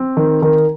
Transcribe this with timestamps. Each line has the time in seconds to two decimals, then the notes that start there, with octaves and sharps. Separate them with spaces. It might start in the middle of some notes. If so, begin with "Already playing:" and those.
Already playing: C4
0.17 D#3
0.42 D#3